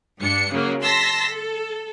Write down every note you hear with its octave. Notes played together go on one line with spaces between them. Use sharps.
G2 D4 C#7
C#3 F#3 A#3
A5 C6 E6 A#6 B6
A4